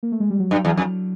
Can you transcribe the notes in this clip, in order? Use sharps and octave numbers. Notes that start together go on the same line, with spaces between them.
A#3
A3
G#3
G3
F#3
G2
E2
F2